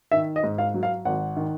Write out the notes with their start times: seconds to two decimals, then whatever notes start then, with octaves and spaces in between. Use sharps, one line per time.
0.12 D#3 E5
0.36 D#5
0.43 G#2
0.58 F5
0.74 F#3
0.83 F5
1.05 G#1 F#5
1.37 D#3